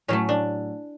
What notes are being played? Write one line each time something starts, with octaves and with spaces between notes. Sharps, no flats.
A2 F#3 A3 C#4
D4